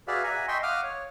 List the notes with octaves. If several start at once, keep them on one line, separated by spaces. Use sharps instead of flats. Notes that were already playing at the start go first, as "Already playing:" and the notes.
F#4 G#4 B4 D5 E5 F5
E5 F#5 G#5 A#5
D#5 E5 G5 C6 C#6
F5 F#5 D6 D#6 F6
C#5